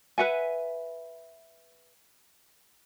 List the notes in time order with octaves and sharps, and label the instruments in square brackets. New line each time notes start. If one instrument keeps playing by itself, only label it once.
[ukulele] B4 E5 F#5 G#5